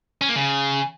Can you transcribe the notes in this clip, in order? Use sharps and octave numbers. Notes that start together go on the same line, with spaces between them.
C#4
A#3
C#3